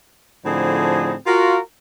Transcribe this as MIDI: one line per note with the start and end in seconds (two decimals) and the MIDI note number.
0.45 1.14 45
0.45 1.14 50
0.45 1.14 53
0.45 1.14 60
0.45 1.14 63
0.45 1.14 68
1.26 1.58 65
1.26 1.58 66
1.26 1.58 70